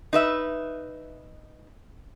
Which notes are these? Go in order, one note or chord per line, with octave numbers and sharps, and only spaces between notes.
D#4 B4 E5